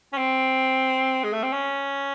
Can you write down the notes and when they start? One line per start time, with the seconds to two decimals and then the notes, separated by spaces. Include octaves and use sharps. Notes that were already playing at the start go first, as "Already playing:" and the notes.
0.13 C#4
0.17 C4
1.24 G#3
1.33 A3
1.43 C4
1.53 C#4